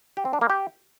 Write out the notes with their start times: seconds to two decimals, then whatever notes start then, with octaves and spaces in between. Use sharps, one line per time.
0.17 G4
0.25 C4
0.33 D4
0.41 A#3
0.50 G4